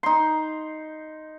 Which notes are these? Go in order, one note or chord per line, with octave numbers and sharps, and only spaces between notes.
D#4 C6